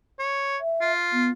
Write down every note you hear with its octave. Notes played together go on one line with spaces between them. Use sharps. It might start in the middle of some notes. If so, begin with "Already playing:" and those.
C#5
E5
F4
B3